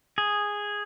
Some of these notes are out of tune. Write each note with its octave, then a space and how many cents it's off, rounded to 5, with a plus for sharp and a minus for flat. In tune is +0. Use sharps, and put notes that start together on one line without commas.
G#4 -5